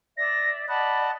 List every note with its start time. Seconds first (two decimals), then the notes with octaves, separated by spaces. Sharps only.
0.17 D5 E5 A#6
0.69 D5 D#5 F#5 A5 B5